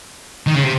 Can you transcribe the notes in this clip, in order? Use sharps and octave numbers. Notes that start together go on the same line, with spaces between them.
D#3
C#3
C3